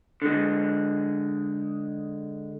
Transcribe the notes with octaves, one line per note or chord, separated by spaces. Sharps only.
D3 G#3